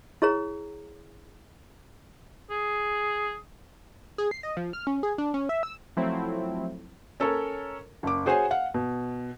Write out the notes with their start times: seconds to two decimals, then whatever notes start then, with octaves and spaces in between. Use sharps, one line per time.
0.22 E4 G#4 C#5 A#5
2.50 G#4
4.18 G#4
4.31 C7
4.43 D#5
4.57 F3
4.73 F6
4.87 C#4
5.03 G#4
5.18 D4
5.34 C#4
5.49 E5
5.63 E6
5.97 F3 F#3 A3 C4 E4
7.20 C#4 A4 A#4 C#5
8.03 F#1 D6
8.26 F#4 G#4 C5 C#5 F#5 G#5
8.51 F5 F#5
8.74 B2